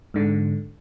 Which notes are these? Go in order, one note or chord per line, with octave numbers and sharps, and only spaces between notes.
G#2 D3